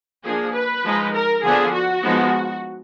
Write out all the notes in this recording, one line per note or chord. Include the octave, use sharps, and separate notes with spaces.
F3 A#3 D4 G#4
B4
F3 G#3 D#4
A#4
D3 F3 B3 D4 G#4
F#4
F3 G#3 B3 D#4